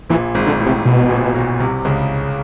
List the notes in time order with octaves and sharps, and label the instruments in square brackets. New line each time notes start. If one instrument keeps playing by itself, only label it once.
[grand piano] A#1 A#2 [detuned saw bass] E3
[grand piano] G#1 G#2
[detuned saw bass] D3
[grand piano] A1 A2
[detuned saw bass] C3
B2
[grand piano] A#1 A#2
B1 B2
C2 C3
C#2 C#3